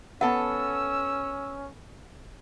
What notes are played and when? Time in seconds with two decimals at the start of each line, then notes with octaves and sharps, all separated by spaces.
0.21 B3 C#4 A4 B4 F#5 E6